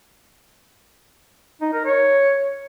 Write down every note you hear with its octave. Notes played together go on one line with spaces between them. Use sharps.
D#4
A#4
C#5